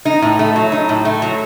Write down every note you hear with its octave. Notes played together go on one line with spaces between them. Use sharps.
D#4
A2
A3
F#3
D#4
A2
A3
F#3